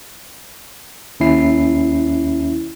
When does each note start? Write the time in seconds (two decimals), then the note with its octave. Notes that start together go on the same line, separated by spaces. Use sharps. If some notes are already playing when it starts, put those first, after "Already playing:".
1.20 D#2 C#4 E4 C7